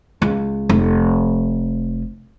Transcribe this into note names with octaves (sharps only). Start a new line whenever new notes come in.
C#2
F1